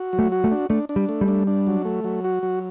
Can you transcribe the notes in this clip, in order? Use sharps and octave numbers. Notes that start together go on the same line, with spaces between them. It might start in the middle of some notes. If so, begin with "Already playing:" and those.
Already playing: F#4
F#3
A3
F#4
A3
D4
A3 D4
D4
G3
A3
G3
D4
D4
F#3
A3
F#3
F#4
F#3